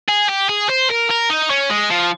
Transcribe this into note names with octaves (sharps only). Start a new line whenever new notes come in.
G#4
G4
G#4
C5
A#4
A#4
D#4
C#4
G#3
F3